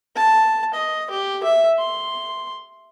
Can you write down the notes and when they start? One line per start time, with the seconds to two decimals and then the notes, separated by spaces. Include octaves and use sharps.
0.16 A5
0.74 D#5
1.10 G4
1.43 E5
1.79 C6